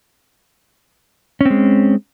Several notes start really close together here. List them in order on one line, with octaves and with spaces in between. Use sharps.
C#4 C4 G#3